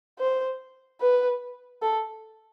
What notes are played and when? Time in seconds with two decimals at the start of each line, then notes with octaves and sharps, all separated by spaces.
0.19 C5
1.01 B4
1.82 A4